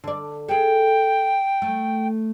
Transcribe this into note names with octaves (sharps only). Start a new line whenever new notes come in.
D3 D5
G#4 A4 G5
A3